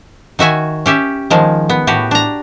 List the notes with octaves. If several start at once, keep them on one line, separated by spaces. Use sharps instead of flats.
D#3 F#4 E5 G#5
C#4 G4 E5
D#3 F3 G#3
B3
A2 F#4 G4
D4 A#5